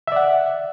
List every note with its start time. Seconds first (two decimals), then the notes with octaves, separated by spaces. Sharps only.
0.07 E5
0.12 D5
0.16 F#5